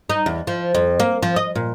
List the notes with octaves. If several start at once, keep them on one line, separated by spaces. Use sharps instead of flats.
D#4
E2
F3
F2
A#3
F3
D#5
A#2